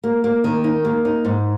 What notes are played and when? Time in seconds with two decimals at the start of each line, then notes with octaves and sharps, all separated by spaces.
0.04 A#3
0.24 A#3
0.44 D#3
0.64 D#4
0.85 A#3
1.05 D#4
1.25 G#2